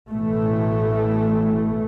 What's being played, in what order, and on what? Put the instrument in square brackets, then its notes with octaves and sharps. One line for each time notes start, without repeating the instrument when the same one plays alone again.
[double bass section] A1 B2 E3 A3